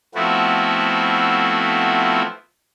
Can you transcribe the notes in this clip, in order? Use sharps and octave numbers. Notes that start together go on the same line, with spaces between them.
F3 A3 B3 C4 E4 F#4